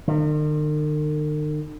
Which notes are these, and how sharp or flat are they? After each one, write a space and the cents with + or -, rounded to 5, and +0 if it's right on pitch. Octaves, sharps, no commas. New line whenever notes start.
D#3 -45